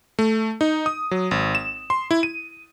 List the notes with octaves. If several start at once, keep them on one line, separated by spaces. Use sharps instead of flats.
A3
D#4
D#6
F#3
G#1
E7
C6
E4
D#7